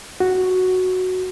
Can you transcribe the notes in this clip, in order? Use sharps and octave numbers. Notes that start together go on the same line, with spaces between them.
F#4